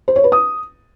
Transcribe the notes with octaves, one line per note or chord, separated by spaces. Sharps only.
C5
C#5
B4
D#6